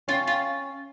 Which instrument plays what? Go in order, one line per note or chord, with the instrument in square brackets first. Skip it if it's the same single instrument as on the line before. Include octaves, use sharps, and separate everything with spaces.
[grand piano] C#4 [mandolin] F4
[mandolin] F4